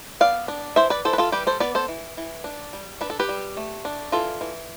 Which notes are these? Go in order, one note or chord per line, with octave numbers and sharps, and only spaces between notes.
B3 D5 F5
D4
E3 C5 E5
B4 D5
E3 A4 C5
B4
F4 A4
G3 G4 B4
A4 C5
B3 B4 D5
A4 C5
E3
E3
D4
G3
D4 B4
A4
G4 B4
G3
A3
D4
E3 F4 A4
E3